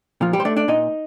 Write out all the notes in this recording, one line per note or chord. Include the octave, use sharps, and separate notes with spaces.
A#2 F3 F4
G3 G4
C5
A3 D4 D5
D4 D5
A#2 D#4 D#5